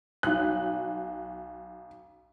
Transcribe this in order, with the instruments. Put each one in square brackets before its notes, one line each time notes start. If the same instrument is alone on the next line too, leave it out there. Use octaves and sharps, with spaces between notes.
[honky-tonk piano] B1 F#6